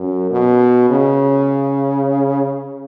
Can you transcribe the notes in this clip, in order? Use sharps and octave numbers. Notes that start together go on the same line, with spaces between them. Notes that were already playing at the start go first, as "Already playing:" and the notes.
Already playing: F#2
B2
C#3